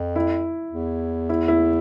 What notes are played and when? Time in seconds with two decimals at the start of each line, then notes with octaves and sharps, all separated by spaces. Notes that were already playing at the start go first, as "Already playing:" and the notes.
Already playing: F2
0.16 E4
0.72 E2
1.29 E4
1.48 E4